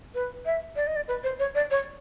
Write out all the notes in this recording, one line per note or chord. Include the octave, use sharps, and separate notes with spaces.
B4
E5
D5
D#5
D5
B4
C5
C#5
D5
C#5